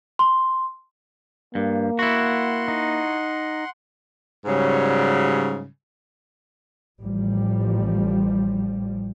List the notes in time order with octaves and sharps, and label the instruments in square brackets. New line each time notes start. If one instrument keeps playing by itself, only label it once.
[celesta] C6
[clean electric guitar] G2 [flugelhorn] A#3
[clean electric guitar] E4 F#4 [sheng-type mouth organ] F#5 C6
[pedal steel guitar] D#4
[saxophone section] G#2 C#3 F#3 G3
[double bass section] A1 F3 G3